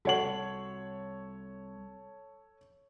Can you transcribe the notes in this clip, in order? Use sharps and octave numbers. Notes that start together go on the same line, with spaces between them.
C2 F#4 A4 C#5 F#5 F#7